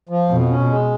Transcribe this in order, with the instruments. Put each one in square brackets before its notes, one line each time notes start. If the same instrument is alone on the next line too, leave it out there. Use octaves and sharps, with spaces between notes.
[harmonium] F3
[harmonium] F2 [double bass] B2
[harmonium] C#4
G#3